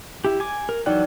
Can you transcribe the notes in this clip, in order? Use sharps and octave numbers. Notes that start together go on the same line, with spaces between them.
E4 G4
G#5 D6
A#4
E3 F#3 D#4 D5 F#5 G5